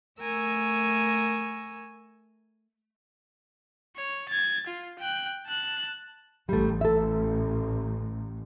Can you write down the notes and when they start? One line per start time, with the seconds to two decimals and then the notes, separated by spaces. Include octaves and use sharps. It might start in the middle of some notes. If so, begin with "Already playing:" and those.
0.20 A3 A#4 G#5 C#6 E6
3.97 C#5
4.29 G#6 A6
4.67 F4
4.99 G5 F#6
5.47 A5 F#6
6.49 A1 G3 A3
6.81 A4 E5